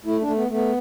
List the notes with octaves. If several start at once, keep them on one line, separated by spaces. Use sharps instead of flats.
A3 E4
D4
A3
B3
A3 B3